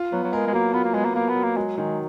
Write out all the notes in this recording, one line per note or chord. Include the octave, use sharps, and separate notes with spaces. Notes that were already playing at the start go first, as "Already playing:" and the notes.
Already playing: F4
F#3 B3
F#3
G#3 A#4
G#3
F#3 A#3
B3 F4
A#3
G#3 B3
A#3
A#3 A#4
B3
F#3
A#3
F#3 G#3
D#3 G#3